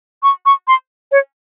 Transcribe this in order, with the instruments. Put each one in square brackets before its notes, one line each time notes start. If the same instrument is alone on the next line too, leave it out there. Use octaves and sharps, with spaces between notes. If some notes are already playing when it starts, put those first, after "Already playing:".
[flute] C#6
C#6
C6
C#5